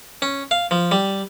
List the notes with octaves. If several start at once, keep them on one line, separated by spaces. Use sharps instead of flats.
C#4
F5
F3
G3